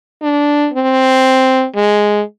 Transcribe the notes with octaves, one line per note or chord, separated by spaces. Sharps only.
D4
C4
G#3